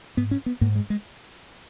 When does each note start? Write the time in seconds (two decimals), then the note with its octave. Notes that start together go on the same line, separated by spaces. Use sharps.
0.17 G#2 B3
0.31 C#4
0.46 B3
0.61 G#2 A#3
0.75 G#3
0.90 G#3